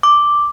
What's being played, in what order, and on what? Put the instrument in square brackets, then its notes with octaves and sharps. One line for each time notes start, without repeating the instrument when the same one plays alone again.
[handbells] D6